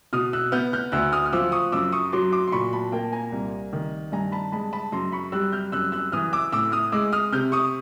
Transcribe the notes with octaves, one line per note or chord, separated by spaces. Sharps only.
B2 D#6 F6
E6 F#6
B3 F6 G6
F6 G6
D2 E6 F#6
D#6 F6
F6
F3 D6 E6
C#6 D#6
F#2 D6 E6
C#6 D#6
F#3 C6 D6
C6 D6
C6
A#2 B5 C#6
A5 B5
A#3 G5 A5
G#5 A#5
C2
D#3
G2 G#5 A#5
A5 B5
G#3 A5 B5
A5 B5
F#2 A#5 C6
B5 C#6
G3 E6 F#6
F6 G6
F#2 E6 F#6
E6 F#6
E3 D#6 F6
D6 E6
A2 D6 E6
D#6 F6
G#3 D6 E6
D#6 F6
C3 F6 G6
C#6 D#6